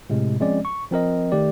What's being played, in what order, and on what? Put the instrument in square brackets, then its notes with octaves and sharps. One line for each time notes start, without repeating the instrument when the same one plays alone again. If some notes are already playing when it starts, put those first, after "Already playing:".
[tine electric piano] A2 C3 G#3
F3 G#3 C4 C#4 D5
C#6
F3 C4 A#4 D#5
D#3 A3 G4 D5